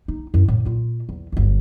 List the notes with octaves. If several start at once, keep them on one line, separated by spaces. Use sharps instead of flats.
D#4
F#2 E4
A2 D#3
A#2 F4
E2
G1 D2